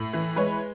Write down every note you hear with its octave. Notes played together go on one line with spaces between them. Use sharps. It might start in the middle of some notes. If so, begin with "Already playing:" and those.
Already playing: A2
E3
G#3 B4 C#5